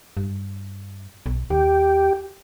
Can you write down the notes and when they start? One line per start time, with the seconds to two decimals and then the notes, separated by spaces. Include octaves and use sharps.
0.17 G2
1.26 B1
1.50 D#2 G4